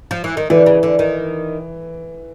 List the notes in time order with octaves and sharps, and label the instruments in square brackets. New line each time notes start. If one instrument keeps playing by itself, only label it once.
[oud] F3
E3
D#3
[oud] D3 [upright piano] E3
[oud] C#3
D3
D#3